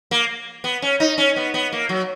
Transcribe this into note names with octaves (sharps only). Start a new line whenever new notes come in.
A#3
B3
C#4
D#4
C#4
B3
B3
A#3
F#3